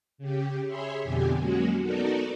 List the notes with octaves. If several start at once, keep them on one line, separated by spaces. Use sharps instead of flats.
C#3 G4
G#4 C#5 E5 B5 C6
F2 B2 D3 G4 G#5
F#3 G#3 A#3 C#4 F#4
B3 D#4 F#4 A4 A#4 D5